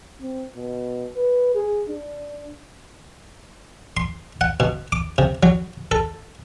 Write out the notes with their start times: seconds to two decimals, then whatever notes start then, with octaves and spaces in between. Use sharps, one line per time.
0.21 C4
0.56 B2
1.16 B4
1.55 G#4
1.89 D4
3.97 C6
4.41 F#5
4.60 B2
4.92 D6
5.18 C3
5.43 F#3
5.91 A4